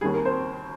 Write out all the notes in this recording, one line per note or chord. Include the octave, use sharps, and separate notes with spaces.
D#2 D#3 G3 G#4
A#4
C5